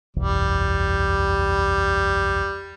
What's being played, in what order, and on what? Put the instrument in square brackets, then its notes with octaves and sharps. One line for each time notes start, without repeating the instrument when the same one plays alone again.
[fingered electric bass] F#1 B1 E2 [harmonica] G3